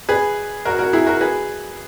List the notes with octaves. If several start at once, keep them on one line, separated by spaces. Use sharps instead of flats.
G#4 B4
F#4 A#4
F#4 A#4
E4 G#4
F#4 A#4
G#4 B4